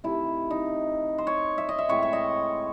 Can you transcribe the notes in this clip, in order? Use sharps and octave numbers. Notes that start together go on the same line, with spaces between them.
C3 D#3 A3 E4
D#4
C5
C#5
E5
D#5
E5
A2 G#3 C4 C#5
E5
D#5